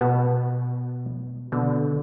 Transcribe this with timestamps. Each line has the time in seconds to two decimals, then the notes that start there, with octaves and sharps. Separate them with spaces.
0.01 B2 B3 F#4 A5
1.52 B2 D3